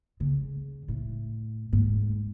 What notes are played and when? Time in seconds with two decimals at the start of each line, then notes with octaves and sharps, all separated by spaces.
0.20 C#3
0.88 A2
1.73 G#2